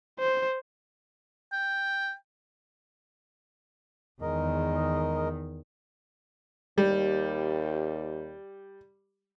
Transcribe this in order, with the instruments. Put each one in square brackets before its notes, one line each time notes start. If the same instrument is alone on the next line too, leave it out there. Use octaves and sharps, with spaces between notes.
[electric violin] C5
[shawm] G5
[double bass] E2 D#3 [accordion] G#3 A#4 D#5
[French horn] D#2 [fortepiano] G3